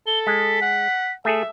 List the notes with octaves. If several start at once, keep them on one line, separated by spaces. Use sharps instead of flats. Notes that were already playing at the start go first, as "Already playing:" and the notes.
A4 G7
G#3 B6
F#5
A3 G#4 A4 E5